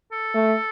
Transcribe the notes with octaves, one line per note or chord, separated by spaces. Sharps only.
A4
A3